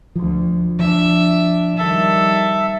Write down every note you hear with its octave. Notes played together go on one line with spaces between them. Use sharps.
D2 F3
F3 D4 E5
D#3 G3 A4 E5